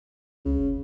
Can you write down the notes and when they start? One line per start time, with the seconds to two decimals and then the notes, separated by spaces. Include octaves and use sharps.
0.45 C#2 C#3
0.58 F1